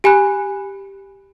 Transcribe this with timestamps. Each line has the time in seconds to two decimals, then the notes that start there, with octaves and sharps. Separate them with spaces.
0.04 G4 G#5 B5 F#6